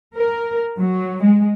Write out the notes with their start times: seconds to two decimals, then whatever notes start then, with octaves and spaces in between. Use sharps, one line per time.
0.15 A#4
0.79 F#3
1.23 G#3